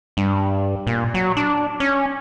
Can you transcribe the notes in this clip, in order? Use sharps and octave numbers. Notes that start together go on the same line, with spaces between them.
G2
A#2
F#3
D4
C#4